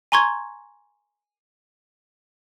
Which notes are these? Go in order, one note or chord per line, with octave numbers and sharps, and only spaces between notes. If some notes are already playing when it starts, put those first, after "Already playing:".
G#5 A#5 C6 C#6 G#6